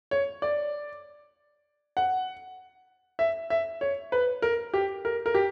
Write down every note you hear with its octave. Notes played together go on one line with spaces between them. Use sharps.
C#5
D5
F#5
E5
E5
C#5
B4
A#4
G4
A#4
A#4
G4